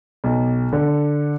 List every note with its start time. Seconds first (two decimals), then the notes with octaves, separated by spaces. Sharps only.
0.24 B1
0.73 D3